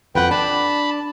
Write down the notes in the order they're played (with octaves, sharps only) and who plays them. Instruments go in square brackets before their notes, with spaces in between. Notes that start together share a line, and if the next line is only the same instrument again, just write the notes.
[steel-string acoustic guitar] F2 F#5 [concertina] B4 G5
[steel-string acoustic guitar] D4 [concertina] A5 B5